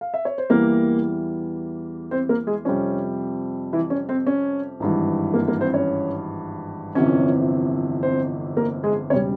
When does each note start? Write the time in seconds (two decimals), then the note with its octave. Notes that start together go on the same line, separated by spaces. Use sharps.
0.01 F5
0.14 E5
0.25 C#5
0.38 C5
0.50 E2 E3 G3 A#3 A#4
2.11 C4 C5
2.29 A#3 A#4
2.47 G#3 G#4
2.65 F2 C3 G3 C#4
3.73 E3 E4
3.90 C#4
4.09 C4
4.27 C#4
4.80 G#1 G2 E3
5.34 A#3 A#4
5.48 A#3 A#4
5.61 C4 C5
5.74 C#4 C#5
6.95 G1 F2 C3 E3 C#4 C#5
8.03 C4 C5
8.57 A#3 A#4
8.84 G#3 G#4
9.10 E1 C#3 G3 C#4 C#5